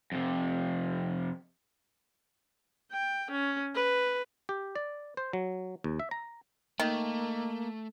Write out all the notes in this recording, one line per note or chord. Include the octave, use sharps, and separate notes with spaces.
F2 C3
G5
C#4
B4
G4
D5
C5
F#3
D#2
E5
A#5
D#3 A3 A#3